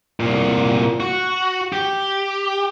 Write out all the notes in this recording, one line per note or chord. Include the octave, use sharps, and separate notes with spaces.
C2 A#2
F#4
G4